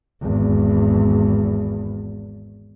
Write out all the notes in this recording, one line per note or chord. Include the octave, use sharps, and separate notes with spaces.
G#1 E2